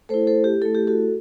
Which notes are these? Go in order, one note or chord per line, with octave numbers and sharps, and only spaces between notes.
A3 E4 A4 C5
A4 C5
G4
A3 E4 A4
G4
F#4 A4